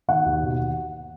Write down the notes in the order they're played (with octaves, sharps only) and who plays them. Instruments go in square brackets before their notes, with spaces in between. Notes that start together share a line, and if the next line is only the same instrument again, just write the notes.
[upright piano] D#3 F#5
D#2
B2